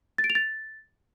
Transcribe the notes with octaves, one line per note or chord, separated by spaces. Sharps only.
A6
D7
F7
A6